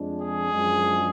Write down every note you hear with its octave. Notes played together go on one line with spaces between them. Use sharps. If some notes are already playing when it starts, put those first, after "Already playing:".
Already playing: F2 F3 G#3 D4
G#4
F#2 F3 G#3 D4